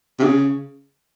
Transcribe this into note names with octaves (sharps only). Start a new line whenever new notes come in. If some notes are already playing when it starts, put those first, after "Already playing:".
C3
C#3